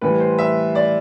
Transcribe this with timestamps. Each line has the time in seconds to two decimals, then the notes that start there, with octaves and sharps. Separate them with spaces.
0.01 A2 E3 G3 B4
0.20 C5
0.39 E5
0.75 D5